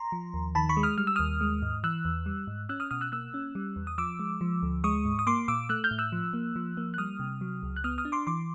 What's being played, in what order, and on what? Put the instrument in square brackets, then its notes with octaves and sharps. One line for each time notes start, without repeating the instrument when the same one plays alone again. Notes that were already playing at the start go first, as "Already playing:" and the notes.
Already playing: [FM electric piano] A#5 C6
F3
D#2
D#3 A5 B5
B5 C#6
G#3
D#6 F6
G3 F6
E6
D#2 D#6 F6
G#3
G#2
E3 E6 F#6
E2
G3
G#2
C#4 E6 F#6
D#6 F6
B2 D#6 F6
E6 F#6
A#3 E6 F#6
C#4
G3
E2
D#6
F3 D6 E6
G#3
F3
D2
G#3 C#6 D#6
G#2
D#6
A#3 C6 D6
A#2 D6 E6
A3 E6 F#6
F6 G6
A2
E6 F#6
F3
A#3
F3
A#3
F#6
G3 D#6 F6
C3
F#3
C#2
F#6
B3 D#6 F6
D#6 F6
D4
C6 D6
E3 C6 D6